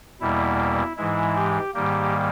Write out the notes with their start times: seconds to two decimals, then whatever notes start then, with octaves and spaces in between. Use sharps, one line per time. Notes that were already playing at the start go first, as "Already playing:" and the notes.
0.21 E2 B2 G3 A#3 E4
0.97 G#2 E3 G#3 E4
1.36 G4
1.74 G#2 D#3 G3 A#3 G4